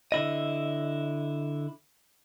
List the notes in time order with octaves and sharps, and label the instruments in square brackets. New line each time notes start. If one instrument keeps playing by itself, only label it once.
[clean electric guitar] D3 E4 D#5